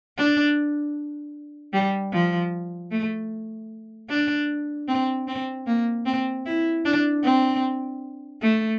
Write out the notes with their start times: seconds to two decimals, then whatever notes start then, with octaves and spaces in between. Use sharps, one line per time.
0.17 D4
1.73 G3
2.13 F3
2.91 A3
4.09 D4
4.88 C4
5.28 C4
5.67 A#3
6.05 C4
6.46 E4
6.85 D4
7.24 C4
8.42 A3